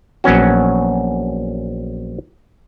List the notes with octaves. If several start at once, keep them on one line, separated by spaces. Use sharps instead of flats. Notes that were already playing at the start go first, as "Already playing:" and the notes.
A#1 F#3 B3 C#4 F#4